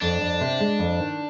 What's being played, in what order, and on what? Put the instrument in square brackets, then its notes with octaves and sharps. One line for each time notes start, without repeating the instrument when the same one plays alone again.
[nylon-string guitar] F2 [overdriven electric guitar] D4
[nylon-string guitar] F2
C3
G#3
F2
D#3